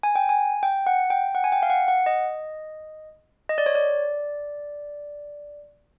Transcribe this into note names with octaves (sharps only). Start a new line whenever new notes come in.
G#5
G5
G#5
G5
F#5
G5
F#5
G#5
G5
F5
F#5
F#5
D#5
D#5
D5
C#5
D5